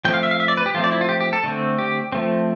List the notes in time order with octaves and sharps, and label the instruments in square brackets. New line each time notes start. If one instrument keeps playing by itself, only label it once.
[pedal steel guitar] F3 A3 C4 G5
F5
E5
F5
E5
D5
B4
G4
F3 A3 C4 F4
D5
E4
F4
G4
G4
A4
D3 A3 C4
G4
F3 A3 C4